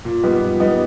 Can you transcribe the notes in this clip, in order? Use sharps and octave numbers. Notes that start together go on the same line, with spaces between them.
A#2
G3 B3 D#4
A#2
G3 B3 D#4